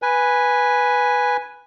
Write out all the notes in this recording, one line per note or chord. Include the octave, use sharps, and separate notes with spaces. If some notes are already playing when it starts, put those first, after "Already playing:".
B4 G#5